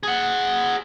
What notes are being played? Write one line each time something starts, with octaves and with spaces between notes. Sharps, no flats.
G#4 F#5